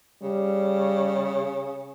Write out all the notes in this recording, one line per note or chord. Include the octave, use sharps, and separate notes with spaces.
C#3 G3